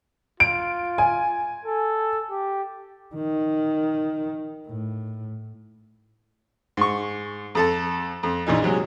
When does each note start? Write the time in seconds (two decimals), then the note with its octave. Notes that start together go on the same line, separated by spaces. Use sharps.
0.40 F4 D7
0.98 G#5
1.65 A4
2.31 G4
3.15 D#3
4.67 A2
6.77 G#2 C#6
7.55 F2 A4 A5
8.23 F2
8.46 A#1 A#2 E3 D#4
8.62 C3 F#3 G#3